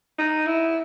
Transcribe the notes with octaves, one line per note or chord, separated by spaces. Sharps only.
D#4
E4